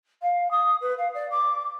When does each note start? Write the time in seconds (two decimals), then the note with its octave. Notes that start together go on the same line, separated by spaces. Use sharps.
0.22 F5
0.51 D#6
0.81 B4
0.98 F5
1.14 D5
1.30 D6